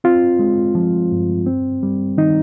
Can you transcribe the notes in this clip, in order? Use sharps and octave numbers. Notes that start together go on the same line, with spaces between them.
C4 F4
G#3
F3
G2
C4
G3
D#3 D#4